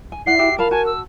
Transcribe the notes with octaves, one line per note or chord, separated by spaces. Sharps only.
G#5
E4 D5 F#5 C7
F#4 G4 E5
F4 A#4 F5 A5 B5
F#4 G#5 A5
E6